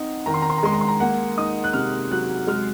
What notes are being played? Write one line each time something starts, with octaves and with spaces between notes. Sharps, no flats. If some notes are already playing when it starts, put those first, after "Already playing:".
Already playing: C4 D#4 F#5
D#3 A#5
C6
A#5
C6
A#5
G#3 C6
A#5
C6
A#5
A#3 F#5
D#4 D#6
F#6
C3 F6
F#3 F#6
G#3 F6